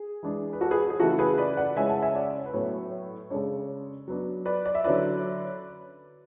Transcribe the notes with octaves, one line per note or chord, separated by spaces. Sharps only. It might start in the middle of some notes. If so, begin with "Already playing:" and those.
Already playing: G#4
E3 G#3 D4
B4
F#4 A4
G#4 B4
G#4
C#3 E3 A3 E4 F#4 A4
G#4 B4
B4 D5
D5 F#5
C#3 G#3 C#4 E4 E5 G#5
F#5 A5
E5 G#5
D5 F#5
B4
A2 F#3 B3 A4 C#5
C#3 G#3 D4 A4 C#5
F#3 B3 D4
B4 D5
D5
E5
D3 F#3 C#4 E4 B4 D5